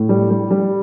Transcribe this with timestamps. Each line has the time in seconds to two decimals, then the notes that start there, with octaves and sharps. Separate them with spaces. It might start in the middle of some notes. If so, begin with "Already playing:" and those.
Already playing: A2
0.09 G3
0.30 G3
0.51 G3